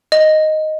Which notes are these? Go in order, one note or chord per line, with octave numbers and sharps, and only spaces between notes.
D#5